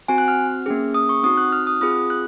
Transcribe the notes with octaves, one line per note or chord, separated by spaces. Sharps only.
C4 F#4 G#5
F#6
F6
A#3 C#4 G#4
D#6
C#6
C4 D#4 F#4 D#6
F#6
F6
D#6
C4 F4 G#4 D#6
F#6